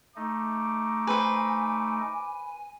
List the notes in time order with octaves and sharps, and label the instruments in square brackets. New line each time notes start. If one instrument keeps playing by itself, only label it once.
[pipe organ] A3 D#4 [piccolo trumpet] D6
[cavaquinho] B4 C5 [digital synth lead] G#5